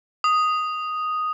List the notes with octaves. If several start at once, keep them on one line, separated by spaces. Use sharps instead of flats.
D#6